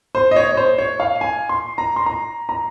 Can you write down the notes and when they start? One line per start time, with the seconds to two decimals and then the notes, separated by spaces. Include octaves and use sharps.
0.15 C5
0.31 D#5
0.36 C#5
0.52 C#5
0.57 C5
0.78 C#5
1.00 F5
1.21 G#5
1.49 C6
1.78 A#5
1.96 C6
2.06 A#5
2.49 A#5